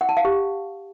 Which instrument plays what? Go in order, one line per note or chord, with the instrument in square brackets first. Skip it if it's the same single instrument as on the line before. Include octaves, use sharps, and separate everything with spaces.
[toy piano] F#5
A5
F5
G4